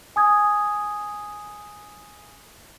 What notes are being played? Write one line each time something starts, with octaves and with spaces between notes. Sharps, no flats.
G#5 D#6 G#6